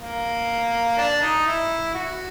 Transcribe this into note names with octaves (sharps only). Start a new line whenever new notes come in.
A#3
D4
D#4
E4
F#4